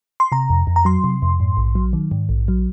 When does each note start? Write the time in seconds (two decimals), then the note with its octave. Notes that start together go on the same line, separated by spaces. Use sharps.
0.20 C6
0.32 C3 A#5
0.50 F2
0.67 F2
0.76 A#5
0.85 F#3 C6
1.04 C3
1.22 F2
1.40 G#2
1.57 A#1
1.75 F#3
1.93 D#3
2.11 G#2
2.29 A#1
2.48 F#3